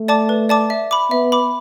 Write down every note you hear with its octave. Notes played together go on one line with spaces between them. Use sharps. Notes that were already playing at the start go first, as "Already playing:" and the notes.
Already playing: A3
D5 A5 D6
B4
D5 A5 D6
E5
B5 D6
B3 E5
B5 D6